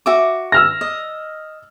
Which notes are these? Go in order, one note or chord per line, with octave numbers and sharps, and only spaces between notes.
F#4 E5 D6
E6 F6 A#6
D#5